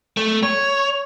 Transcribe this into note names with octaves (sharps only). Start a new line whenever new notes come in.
A3
C#5